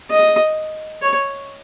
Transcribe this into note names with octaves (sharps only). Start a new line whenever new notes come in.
D#5
C#5